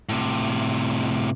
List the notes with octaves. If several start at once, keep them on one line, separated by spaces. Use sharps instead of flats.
A2 C3